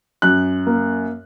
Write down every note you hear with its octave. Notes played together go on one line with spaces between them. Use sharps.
F#2 F#6
A#3